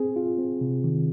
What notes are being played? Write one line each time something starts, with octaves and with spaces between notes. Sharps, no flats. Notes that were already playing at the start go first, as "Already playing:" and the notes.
Already playing: C4 G#4
F4
C4
C3
D#3